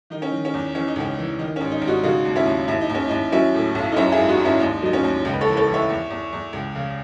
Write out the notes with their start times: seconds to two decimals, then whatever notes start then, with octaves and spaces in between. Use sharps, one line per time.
0.10 D#3 D#4
0.22 C#4
0.32 D#3
0.45 C#4
0.54 E2
0.75 E3 C#4
0.88 D#4
0.96 C#2 C#4
1.18 E3
1.39 D#3 D#4
1.56 C#4
1.61 G#1
1.71 D#4
1.82 G#1
1.87 D#4 F#4
2.03 C#3 D#4 F#4
2.25 D#2
2.36 C#4 E4
2.46 D#2
2.68 D#2 E4
2.81 D#4
2.90 D#2 C#4
3.08 D#4
3.11 D#2
3.32 F#3 C#4 E4
3.54 A2
3.75 B1
3.92 D#4
3.96 F#2 C#4 E4
4.12 E4 G#4
4.18 G#1
4.29 D#4 F#4
4.40 G#1
4.45 C#4 E4
4.60 D#2 D#4
4.82 F#3 D#4
4.93 C#4
5.04 D#2
5.25 C#2 D#4
5.34 B4
5.41 A4 C#5
5.47 E3
5.53 B4
5.57 A4 C#5
5.68 E3
5.73 C#5 E5
5.89 E2
6.10 E2
6.33 E2
6.53 C#2
6.75 C#3